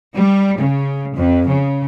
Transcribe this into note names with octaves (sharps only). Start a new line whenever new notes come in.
G3
C#3
F2
C#3